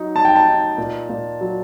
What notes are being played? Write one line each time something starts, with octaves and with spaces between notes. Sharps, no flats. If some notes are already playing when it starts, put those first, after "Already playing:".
Already playing: F#3 D#4
D#4 A5
G5
A5
D#4
A#2
A#2
F#3